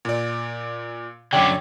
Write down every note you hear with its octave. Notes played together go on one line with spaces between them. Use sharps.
A#2 D5
F#2 D3 C#5 D5 G5